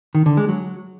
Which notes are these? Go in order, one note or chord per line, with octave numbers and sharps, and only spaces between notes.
D#3
D3
G#3
F#3